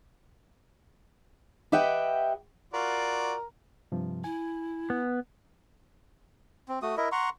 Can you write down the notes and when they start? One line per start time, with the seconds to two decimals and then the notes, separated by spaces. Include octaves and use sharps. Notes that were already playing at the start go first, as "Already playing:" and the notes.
1.72 G4 B4 D#5 E5 F#5 G5
2.73 F4 F#4 A#4 D5
3.92 G2 C3 F3
4.24 E4 G#5
4.90 B3
6.68 C4
6.82 A3 F#4 D#6
6.97 E4 A#4 D#5 E5
7.12 F#5 A#5 C6 C#6